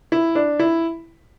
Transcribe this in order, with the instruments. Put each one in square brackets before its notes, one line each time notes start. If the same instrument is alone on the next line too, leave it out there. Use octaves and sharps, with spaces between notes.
[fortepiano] E4
D4
E4